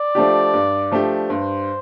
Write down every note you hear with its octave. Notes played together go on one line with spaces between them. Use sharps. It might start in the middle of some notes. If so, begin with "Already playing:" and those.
Already playing: D5
F3 A3 D4 G4
G2
F3 A3 D4 G4
G2 C5